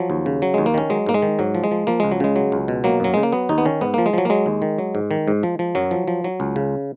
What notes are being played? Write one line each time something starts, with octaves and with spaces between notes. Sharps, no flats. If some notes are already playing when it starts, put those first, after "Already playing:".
Already playing: F3 F#3
D#2
C#3
F#3
D#2 G#3
A#3
D#3 C#4
F#3 G#3
G#2 A#3
G#3
D#3
G#2 F#3
F3
G#3
F3
F3 A#3
C#2 G#3
F#3
C#3 G#3
F#3
C#2
B2
F#3 A#3
F#2 F#3
C#3 G#3
A#3
F#3 B3
D#2 D#4
B3
D#3 C#4
G#2 B3
F3 A#3
G#3
F3 F#3
A#3
F#3 G#3
D#2
D#3
F#3
G#2
D#3
G#2
F3
F3
F#2 F#3
F3
F3
F#3
C#2
C#3